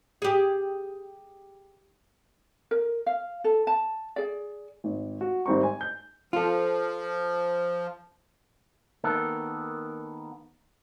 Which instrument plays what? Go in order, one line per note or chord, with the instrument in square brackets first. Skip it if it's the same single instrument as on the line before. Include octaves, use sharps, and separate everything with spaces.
[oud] G4 G#4
[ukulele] A#4
F5
A4
A5
G#4 D5
[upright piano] G#1
F#4
G#1 G3 C4 A#5 C#6
G#5
G6
[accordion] F3 [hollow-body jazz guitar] F4 A4
[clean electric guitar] D#3 A#3 B3 A4